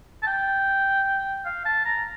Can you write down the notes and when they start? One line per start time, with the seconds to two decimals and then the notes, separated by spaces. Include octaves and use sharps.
0.22 A5
0.27 G5
1.46 F5
1.65 A5
1.85 A#5